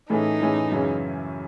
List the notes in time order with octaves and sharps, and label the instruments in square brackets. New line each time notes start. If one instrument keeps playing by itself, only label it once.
[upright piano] A2 E3 A3 C#4 G#4 [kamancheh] D#4
[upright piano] A2 E3 A3 C#4 G#4
F#2 C#3 E3 G#3 C#4